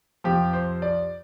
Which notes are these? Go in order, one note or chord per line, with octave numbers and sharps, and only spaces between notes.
F2 C3 F3 G4
C5
D5